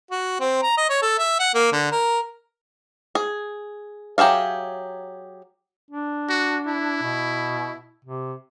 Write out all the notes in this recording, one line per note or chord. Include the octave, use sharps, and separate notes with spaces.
F#4
C4
A#5
D#5
C#5
A4
E5
F#5
A#3
D3
A#4
G#4
F#3 G4 G#4 E5 F5
D4
F#4
E4
B2
C3